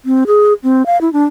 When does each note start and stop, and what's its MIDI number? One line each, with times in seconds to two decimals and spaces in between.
0.05 0.24 60
0.27 0.53 68
0.63 0.85 60
0.86 0.99 77
1.01 1.12 64
1.13 1.24 62